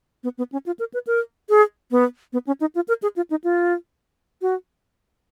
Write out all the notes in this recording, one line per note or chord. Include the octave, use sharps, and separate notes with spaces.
B3
B3
C#4
F4
A#4
B4
A#4
G#4
B3
B3
C#4
D#4
F4
A#4
G#4
F4
D#4
F4
F#4